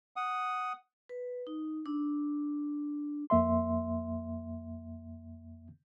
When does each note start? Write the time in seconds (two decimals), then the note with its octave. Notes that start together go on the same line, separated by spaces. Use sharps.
0.16 F#5 D#6
1.09 B4
1.47 D#4
1.86 D4
3.30 F2 A#3 E5 C6